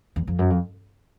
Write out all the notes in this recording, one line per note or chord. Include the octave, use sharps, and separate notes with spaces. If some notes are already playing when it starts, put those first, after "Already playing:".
E2
F2
F#2
F2